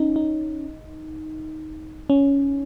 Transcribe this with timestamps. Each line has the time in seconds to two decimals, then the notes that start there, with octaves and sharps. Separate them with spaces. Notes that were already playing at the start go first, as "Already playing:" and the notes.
Already playing: C#4 D#4
0.16 D#4
2.10 C#4